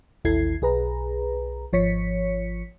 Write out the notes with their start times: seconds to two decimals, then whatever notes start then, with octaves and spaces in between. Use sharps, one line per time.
0.25 A1 D#2 E4 A4 G#6 C7
0.62 B1 G#4 B4 A#5
1.73 G#1 F3 C#5 B6 C#7